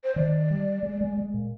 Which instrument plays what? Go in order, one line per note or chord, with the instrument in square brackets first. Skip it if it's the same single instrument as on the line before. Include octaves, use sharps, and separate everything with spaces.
[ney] C5
[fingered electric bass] D#3 [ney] D5
[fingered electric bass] G3
G#3
G#3
G#3
A#2